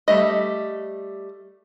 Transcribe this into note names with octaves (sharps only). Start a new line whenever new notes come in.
G3 A3 D#5